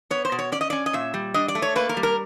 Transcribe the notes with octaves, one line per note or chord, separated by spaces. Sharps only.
B3 C#5
C5
B2
C#5
C#4 D5
D#5
C#4 D5
D#5
A#2 E5
G3
D4 D#5
D5
A3
C#5
A#3 B4
A#4
G3
A#4